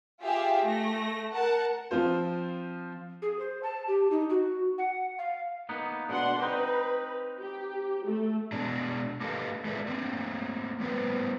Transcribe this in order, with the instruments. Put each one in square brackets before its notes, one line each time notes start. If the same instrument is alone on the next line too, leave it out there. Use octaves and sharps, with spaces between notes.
[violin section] F4 G4 G#4 E5 F5
A3 A#6
A#4 F#5 A5
[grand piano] F3 C4 F4 C5
[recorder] G#4
C5
A5
G4
D#4
F#4
F#5
F5
[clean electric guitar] A#3 B3 D#4
[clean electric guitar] B2 [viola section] D4 F#5 C6
[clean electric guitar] C4 D#4 [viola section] B4
[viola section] G4
A3
[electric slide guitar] B2 G#3 D4
A#3 G4 A4 B4 D#5 F5
G#3 G#4 A4 B4 D5 E5
A3 A#3 C4
G3 B3 B4 C5